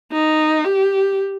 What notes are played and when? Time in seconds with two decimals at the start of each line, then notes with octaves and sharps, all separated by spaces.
0.13 D#4
0.64 G4